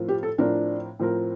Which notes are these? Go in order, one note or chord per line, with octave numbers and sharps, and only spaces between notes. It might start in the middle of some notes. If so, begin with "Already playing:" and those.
Already playing: A2 F3 C4 F4 A#4
G4
A4
A2 F3 C4 D4 F4 A#4
A2 F3 C4 F4 A#4